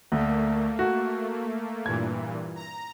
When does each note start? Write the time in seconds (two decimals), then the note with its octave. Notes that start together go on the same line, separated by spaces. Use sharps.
0.12 D2 A3 A#3
0.79 F#4
1.86 G2 A#2 E3 G#6
2.56 A#5